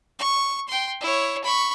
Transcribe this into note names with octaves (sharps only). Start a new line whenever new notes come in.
C#6
G5 C6
E4 C#5
B5 C#6